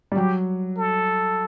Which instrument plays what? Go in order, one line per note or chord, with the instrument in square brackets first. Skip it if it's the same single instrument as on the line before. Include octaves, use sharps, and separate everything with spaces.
[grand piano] G3
[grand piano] F#3 [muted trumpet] G4
[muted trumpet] A4